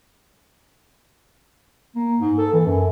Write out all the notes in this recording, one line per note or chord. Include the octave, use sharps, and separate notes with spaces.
A#3
G#2
A4
E3
F#2